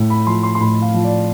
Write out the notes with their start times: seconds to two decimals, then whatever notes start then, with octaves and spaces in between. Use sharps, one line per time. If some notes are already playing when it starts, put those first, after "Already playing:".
Already playing: A2
0.10 B5
0.27 F3 C6
0.43 C6
0.55 C6
0.60 A2 B5
0.82 F5
0.94 F3
1.04 D5